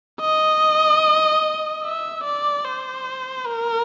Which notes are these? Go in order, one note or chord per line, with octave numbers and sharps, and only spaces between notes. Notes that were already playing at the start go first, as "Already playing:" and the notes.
D#5
E5
D5
C5
A#4